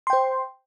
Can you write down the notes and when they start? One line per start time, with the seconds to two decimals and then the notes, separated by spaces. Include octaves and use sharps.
0.07 C6
0.10 G5
0.13 C5